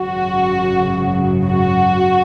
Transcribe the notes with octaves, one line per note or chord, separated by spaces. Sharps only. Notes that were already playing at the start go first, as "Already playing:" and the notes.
Already playing: G#1 F#2 C#3 F#4
F#4